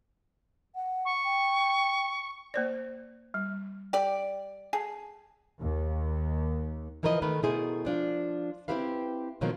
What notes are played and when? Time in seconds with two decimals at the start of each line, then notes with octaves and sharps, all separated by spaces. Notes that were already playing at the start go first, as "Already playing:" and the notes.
0.75 F#5
1.05 C#6
1.25 G5
2.54 A#3 C5 D5
3.34 G3
3.93 G4 D5
4.73 G#4 A5
5.61 D#2
7.03 E3 F3 A#4 B4 C#5 D#5
7.22 D#3 A3 A#4 B4
7.43 B2 A3 E4 G#4 A#4 C5
7.85 F3 D4 F4
8.68 C4 D4 E4 G4 B4 F5
9.41 B2 D3 D#3 F3 F#3 A#3